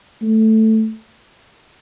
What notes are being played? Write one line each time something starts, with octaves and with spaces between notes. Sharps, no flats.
A3